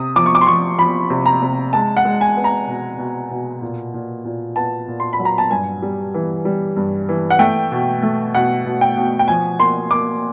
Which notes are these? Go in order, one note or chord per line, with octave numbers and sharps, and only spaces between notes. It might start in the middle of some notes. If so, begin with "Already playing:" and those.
Already playing: C3 D#6
F3 D6
C#6
D6
C6
F3 C#6
F3 B5
C3
A#5
C3
G#3 A5
F#5
G#3
G#5
B3
A#5
B2
B2
B2
A#2
A#2
A#2
B3 A5
A#2
C6
B5
F#3
A#5
A5
G2 G#5
G3
E3
G3
G2
E3
F#5
A3 G5
B2
A3
B2 F#5
B2
G5
B2
G5
F3 G#5
A#3 C6
A#3 D6